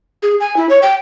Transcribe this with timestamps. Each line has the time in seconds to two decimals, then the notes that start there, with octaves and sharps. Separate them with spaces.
0.23 G#4
0.40 G#5
0.57 E4
0.69 C#5
0.82 G5